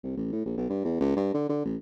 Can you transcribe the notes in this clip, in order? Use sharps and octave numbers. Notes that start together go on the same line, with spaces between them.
C2
A1
A2
A#1
B1
G2
E2
C#2
G2
D3
D3
A1